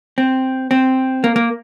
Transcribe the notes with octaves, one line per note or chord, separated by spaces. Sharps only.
C4
C4
A#3
A#3